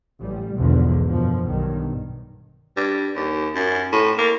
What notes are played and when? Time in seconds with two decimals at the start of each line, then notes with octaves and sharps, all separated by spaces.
0.24 A1 G3
0.58 B1 E2 G#2 B2 D3 F3
1.09 F#2 B2 F3
1.50 B1 G2 D#3
2.77 G2
3.16 D#2
3.55 F#2
3.92 A2
4.18 A#3